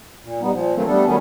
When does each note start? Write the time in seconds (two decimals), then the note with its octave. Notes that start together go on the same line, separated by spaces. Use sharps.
0.23 A#2
0.41 G3 B3 D#4
0.53 A#2 F3
0.75 D#3 E3 F#3 A3 A#3 C4
0.87 G3 A3 B3 D4 A4
1.06 D#3 F#3 G3 A3 B3 C#4